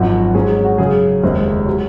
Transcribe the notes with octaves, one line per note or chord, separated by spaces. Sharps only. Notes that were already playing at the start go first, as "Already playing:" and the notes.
Already playing: G#1 F#2 F3 F#4
G#2 F#3 C#4 G#4
G#4
F#4
F#2 C#3 F#3 G#4
F1 D#2 C#3 G#3 C4
C3 F#3 C#4